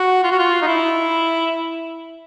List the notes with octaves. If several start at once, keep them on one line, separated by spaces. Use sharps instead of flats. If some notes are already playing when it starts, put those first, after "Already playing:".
Already playing: F#4
F4
F#4
F4
D#4
E4